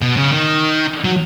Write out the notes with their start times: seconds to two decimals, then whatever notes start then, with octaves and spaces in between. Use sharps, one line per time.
0.02 B2
0.17 C#3
0.31 D#3
1.04 F#3